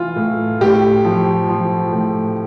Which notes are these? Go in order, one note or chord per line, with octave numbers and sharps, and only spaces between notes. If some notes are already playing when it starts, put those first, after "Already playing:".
Already playing: E3 F4
A2
A2 G4
F3
F3
A2